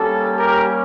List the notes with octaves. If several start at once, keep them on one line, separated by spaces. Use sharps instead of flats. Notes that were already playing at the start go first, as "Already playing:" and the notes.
Already playing: G3 A#3 C#4 G4 A4
G4 A#4